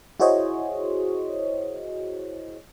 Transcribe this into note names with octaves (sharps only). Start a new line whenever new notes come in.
E4 F#4 G#4 C5 C#5 D#5